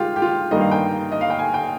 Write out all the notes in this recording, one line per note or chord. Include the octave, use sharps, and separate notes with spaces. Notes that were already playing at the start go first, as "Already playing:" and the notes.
Already playing: D#3 G#3 F4 G4
G4
F4
G2 D#3 G3 A#3 D#5
F5
G5
D#5
F5
G5
G#5
G5